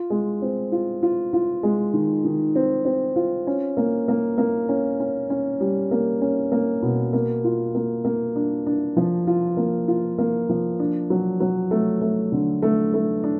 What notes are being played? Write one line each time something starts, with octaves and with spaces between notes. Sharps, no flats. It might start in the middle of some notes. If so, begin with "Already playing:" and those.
Already playing: F4
G#3
C4
F4
F4
F4
G#3
D#3
D#3
C4
C4
F4
C#4
A#3
A#3
A#3
C#4
C#4
C#4
G3
A#3
C#4
A#3
B2
A#3
F4
A#3
A#3
D4
D4
F3
F4
A#3
F4
A#3
F3
D4
F#3
F#3
A3
A3
D3
A3
A3
D4